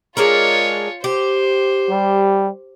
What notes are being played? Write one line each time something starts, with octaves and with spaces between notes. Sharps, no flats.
G#3 D4 F4 A#4 C#5
G4 C5
G3